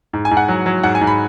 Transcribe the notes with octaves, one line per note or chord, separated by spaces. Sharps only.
G#2
G#5
G#2
F#5
F#3
F#3
G#2 F#5
G#5
G#2
B5